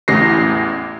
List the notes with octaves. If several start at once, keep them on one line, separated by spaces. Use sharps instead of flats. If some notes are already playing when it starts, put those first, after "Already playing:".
A1 E2 A#6 C7